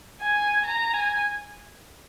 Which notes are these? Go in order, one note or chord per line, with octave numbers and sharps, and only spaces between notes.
G#5
A#5
G#5